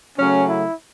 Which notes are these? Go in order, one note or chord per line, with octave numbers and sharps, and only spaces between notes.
C#3 F#3 A3 C#4
E4